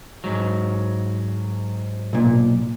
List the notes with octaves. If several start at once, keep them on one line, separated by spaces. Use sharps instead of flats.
G#2 F#3
B1 A#2